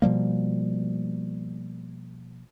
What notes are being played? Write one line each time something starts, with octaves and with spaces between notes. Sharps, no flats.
B2 F3 G3 A#3